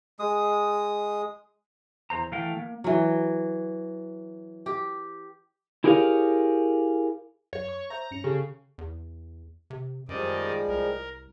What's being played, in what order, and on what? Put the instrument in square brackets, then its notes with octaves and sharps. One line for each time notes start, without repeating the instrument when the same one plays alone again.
[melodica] G#3 D#6
[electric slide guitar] E2 C5 A#5
E3 A3 F5 G5
A#3
[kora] E3 F#3
G4
[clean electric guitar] E4 G4 G#4 A#4 C#5 F5
[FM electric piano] F#2 [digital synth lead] C#5
[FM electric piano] C#6
[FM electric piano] C5 E5 G6 [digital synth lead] A#5
[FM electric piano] G2 C#4 C#7
[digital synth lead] C#3 [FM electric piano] G4 A4
[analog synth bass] E2
C3
[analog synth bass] F#2 [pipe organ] D#3 D5 D#5 [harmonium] F3 G3 G#3
[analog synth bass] C2 [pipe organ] A#4